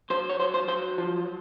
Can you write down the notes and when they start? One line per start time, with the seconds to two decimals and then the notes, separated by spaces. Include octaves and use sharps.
0.10 F#3 C5
0.30 C#5
0.39 F#3 C5
0.54 C5
0.68 F#3 C5
0.98 F3